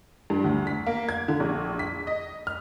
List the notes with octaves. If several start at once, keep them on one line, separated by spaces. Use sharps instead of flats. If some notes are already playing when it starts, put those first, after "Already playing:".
G2
D2
B6
A#3
G#6
D3
A#1
B6
D#5
F6